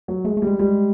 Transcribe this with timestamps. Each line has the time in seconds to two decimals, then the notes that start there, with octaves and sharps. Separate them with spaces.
0.08 F#3
0.25 G#3 A3
0.37 A3
0.42 G3 G#3
0.59 G3 G#3